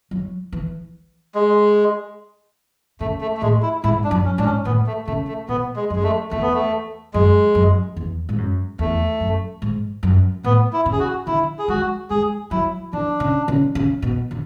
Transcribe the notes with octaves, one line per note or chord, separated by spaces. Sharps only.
F#3
E3
G#3
C#3 A3
A3
A3
A2 G#3
E4
G#2 E4
D4
F#2
C#4
G#2 D4
C#4
A2 B3
A3
C#3 A3
A3
B2 B3
G#3
F#2
G#3
A3
E2 A3
B3
A3
F#2 G#3
F#2
E2
G#2
F#2
E2 A3
F#2
G#2
F#2
A2 B3
E4
C#3
G#4
F#4
D3 E4
G#4
G#3 F#4
G#3 G#4
F#3 E4
E3 D4
C#3
C#3
C#3
B2
D3